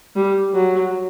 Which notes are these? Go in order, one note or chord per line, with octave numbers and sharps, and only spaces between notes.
G3
F#3